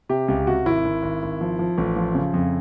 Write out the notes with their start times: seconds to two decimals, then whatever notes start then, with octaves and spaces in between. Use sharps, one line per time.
0.09 C3 G4
0.28 C#2 G4
0.47 C3 F#4
0.66 G#1 E4
0.85 G#1
1.03 G#1
1.22 G#1
1.41 F3
1.59 F3
1.78 A1
1.96 F3
2.15 C#3
2.34 F2